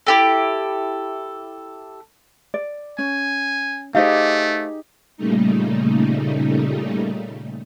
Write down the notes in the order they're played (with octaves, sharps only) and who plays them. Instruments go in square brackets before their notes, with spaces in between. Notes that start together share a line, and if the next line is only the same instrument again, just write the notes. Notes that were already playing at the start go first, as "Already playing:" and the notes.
[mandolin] E4 G4 A4
[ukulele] D5
[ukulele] C#4 [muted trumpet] G#5
[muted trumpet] A3 [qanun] D#4 G4 G#4 [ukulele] C5 D#5 F5
[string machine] A#2 C#3 G3 A3 D#4